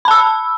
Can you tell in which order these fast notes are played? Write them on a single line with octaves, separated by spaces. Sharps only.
B5 A5 E6